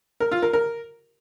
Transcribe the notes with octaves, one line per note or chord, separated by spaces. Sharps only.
A#4
F4
A#4
A#4